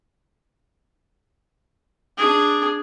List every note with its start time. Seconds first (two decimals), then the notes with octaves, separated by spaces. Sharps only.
2.17 D4 G#4